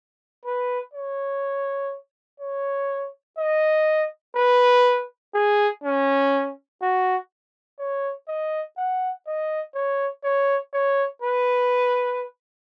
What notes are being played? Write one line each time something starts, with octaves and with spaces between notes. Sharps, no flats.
B4
C#5
C#5
D#5
B4
G#4
C#4
F#4
C#5
D#5
F#5
D#5
C#5
C#5
C#5
B4